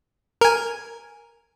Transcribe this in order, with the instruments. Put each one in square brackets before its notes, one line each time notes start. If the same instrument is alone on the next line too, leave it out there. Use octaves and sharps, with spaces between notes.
[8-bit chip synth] A#4 G#5